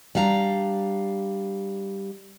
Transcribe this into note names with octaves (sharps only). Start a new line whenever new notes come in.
G3 D4 F5 A#5